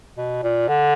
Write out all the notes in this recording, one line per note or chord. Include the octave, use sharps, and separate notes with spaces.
B2
A#2
D3